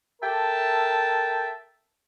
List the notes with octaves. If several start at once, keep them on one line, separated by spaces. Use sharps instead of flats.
A4 A#4 E5 G5 A5